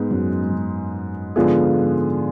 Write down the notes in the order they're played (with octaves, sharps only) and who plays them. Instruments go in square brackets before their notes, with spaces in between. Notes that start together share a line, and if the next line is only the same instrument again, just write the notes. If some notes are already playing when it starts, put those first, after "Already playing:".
Already playing: [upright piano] G#2 G#3 B3
[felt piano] F#2
G#2
F#2
[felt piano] G#2 [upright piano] D3 F3 B3 F4 G#4
[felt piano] G#2